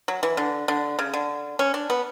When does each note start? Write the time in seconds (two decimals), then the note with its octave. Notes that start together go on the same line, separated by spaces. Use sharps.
0.08 F#3
0.23 E3
0.37 D3
0.68 D3
0.99 C#3
1.14 D3
1.59 C#4
1.74 D4
1.90 B3